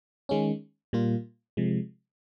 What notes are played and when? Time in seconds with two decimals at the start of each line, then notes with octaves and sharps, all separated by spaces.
0.29 D#3 G#3 C#4
0.93 A#2 G3 A#3 F4
1.57 C3 F3 G#3